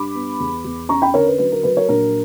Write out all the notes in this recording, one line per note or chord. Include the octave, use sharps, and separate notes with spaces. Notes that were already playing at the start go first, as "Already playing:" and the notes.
Already playing: G2 B5 D6
B3
E2
E2
C#4 A#5 C#6
G5 B5
D3 A#4 C#5
B4
F#3 B4
A#4
F#3 B4
A#4 C#5
A#1 A#4